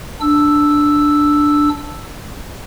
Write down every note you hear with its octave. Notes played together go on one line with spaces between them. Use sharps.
D4 E6